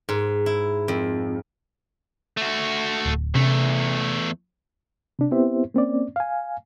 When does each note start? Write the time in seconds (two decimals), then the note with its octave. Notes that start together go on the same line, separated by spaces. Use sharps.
0.09 G#2
0.46 E4
0.88 F2
2.37 A3 F#4
3.05 D1
3.35 E2 C3 A3 C#4
5.19 C3 D4
5.31 B3 C4 E4 G4 C5 E5
5.74 A#3 C4 C#4 D5
6.16 F5 G#5